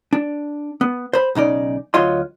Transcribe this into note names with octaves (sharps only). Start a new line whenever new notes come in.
D4
B3
C5 B5
B1 C#3 D#4 D5
D2 F#3 F4 C#5 D#5 C6